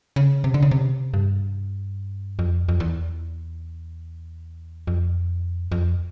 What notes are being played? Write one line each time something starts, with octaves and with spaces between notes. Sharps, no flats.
C#3
C3
D3
C#3
C3
G2
F2
F2
E2
F2
F2